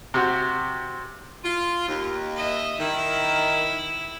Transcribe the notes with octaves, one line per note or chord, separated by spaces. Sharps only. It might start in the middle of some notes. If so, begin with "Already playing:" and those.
C3 F#4 G4
F4
D#2
D#5 E5
D#3 E4